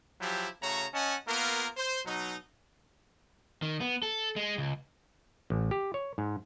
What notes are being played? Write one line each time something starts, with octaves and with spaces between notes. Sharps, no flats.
F3 F#3 E4 G4
C#3 A3 F#4 C#5 A#5
C#4 D#5 F#5 G#5 A5
A#3 B3 F4 A#4
C5
B2 F#3 D#4
D#3
B3
A4
G#3
C#2
A1
G4
C#5
G#2